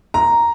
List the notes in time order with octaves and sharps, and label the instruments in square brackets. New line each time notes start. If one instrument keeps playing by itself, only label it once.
[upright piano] A#5